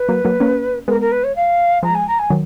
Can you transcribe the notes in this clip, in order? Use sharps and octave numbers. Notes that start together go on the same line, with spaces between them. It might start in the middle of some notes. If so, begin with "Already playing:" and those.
Already playing: B4
F#3 A#3
F#3 A#3
A#3 C#4
G#3 B3 A#4
A#4
B4
C#5
F5
F3 G#3 A#5
G#5
A#5
G#5
D#3 F#3